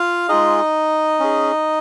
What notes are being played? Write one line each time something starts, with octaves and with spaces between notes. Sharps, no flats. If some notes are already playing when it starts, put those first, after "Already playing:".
Already playing: F4 F5
G#3 D#4 F4 G#4 D#5
C#4 G#4